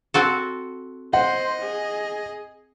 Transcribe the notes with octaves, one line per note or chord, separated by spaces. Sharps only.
C4 F#4 A4
C5 D#5 F#5
G#4